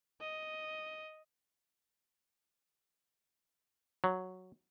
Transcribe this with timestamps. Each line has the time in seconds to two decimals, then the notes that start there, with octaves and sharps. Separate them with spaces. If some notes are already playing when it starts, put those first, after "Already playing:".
0.21 D#5
4.04 F#3